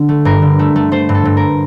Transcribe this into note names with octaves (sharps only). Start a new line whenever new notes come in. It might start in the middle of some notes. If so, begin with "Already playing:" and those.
Already playing: D3
A3
G2 A#4
D3
A3
A3
A3 C5
G2
A4
G2
A#4